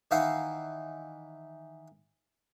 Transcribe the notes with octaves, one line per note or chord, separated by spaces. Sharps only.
D#3 E3 D#4 E4 F5 F#5